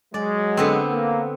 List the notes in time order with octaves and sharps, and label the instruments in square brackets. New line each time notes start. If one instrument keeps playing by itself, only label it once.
[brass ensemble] F#3 G#3 [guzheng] D5
[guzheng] D3 B3 C4
[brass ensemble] A#3